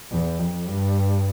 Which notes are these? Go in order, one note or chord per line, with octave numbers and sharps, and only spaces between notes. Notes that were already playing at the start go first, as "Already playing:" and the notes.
E2
F2
G2